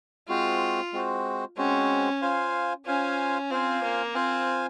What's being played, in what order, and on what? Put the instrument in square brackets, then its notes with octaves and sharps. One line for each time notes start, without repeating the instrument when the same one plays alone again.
[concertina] G#3 C4 F#4 C5 [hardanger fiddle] F4
[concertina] G#3 C4 F#4 C5
[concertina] G#3 C4 F#4 C5 [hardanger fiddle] C#4
[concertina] F4 C5 F5 G#5
[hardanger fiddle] C#4 [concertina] F4 C5 F5 G#5
[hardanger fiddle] C4 [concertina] F4 C5 F5 G#5
[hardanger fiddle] A#3
[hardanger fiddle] C4 [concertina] F4 C5 F5 G#5